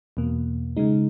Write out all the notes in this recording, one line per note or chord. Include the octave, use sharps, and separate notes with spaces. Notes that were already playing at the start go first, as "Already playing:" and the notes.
E2 B2 A#3
C#3 G#3 D#4